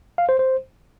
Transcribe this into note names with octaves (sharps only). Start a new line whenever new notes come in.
F5
C5
C5